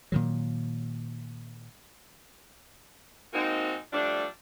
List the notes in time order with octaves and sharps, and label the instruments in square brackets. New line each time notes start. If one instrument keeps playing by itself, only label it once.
[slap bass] A#2 D#3 F#3
[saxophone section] G#3 A#3 C4 D#4 F#4
F3 G3 A3 D4